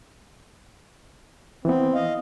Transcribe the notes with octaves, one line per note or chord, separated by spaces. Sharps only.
E3 B3 C4
D#5 F5